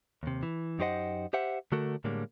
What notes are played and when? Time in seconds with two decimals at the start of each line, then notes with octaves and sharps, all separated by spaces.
0.23 D#2 C3
0.43 E3
0.79 F#2 D#4 G4 C5 D#5 F#5
1.33 G4 C5 E5 F#5
1.72 D3 A3 F#4 A4 A#4
2.04 A2 D3 G3 G#3 A#3